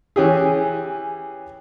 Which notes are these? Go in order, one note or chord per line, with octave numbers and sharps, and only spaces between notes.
E3 C#4 G4 G#4